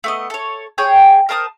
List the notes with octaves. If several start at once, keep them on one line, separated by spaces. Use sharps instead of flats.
A3 B3 D#5
A4 C#5
G#4 C#5 G5
A#4 C5 A5 D#6